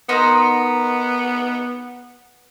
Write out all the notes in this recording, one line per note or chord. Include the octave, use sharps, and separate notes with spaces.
B3 D#4 A#4 C6